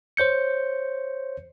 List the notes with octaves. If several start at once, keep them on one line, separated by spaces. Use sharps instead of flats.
C5 C#5 G6 C#7